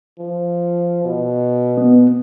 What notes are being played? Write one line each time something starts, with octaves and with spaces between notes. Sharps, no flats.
F3
B2
B3